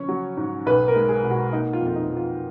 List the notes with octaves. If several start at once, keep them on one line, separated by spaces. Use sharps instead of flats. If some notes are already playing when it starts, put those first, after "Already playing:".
Already playing: C#3 F3 C#4 C#5
F#3
G#2
B1 B4
A#4
G#3
G#4
B2
F#4
A#3 D#4
F4
F2
F4
D#4
F3
F4